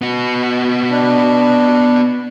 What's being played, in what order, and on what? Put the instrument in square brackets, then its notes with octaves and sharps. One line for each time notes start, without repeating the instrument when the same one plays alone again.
[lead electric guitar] B3 F#4
[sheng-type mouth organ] D4